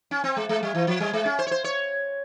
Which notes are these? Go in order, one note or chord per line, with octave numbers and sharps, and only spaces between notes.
C#4
C4
G#3
G#3
G3
E3
F3
G3
G#3
C#4
C5
C#5
C5
C#5